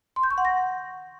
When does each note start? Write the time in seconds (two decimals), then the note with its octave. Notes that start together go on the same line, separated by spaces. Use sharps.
0.16 C6
0.23 G6
0.31 C#6
0.38 F#5
0.45 A#6